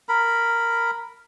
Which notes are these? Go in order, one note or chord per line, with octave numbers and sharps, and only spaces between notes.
A#4 B5